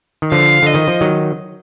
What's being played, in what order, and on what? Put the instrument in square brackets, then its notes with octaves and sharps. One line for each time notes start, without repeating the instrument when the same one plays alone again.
[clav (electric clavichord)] D#3
[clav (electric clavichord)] D3 F3 [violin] F5
[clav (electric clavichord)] D3 [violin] D#5
[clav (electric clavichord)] D#3
F3
D#3 F#3